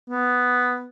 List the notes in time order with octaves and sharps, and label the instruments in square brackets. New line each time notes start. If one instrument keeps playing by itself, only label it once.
[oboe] B3